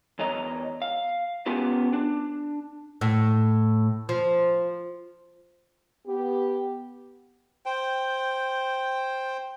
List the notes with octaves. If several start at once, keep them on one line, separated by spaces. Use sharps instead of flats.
E2 C#5 D#5 A#5
F5
B3 C#4 F4 G4 B4
D4
A2
F3
B3 G4
C5 G5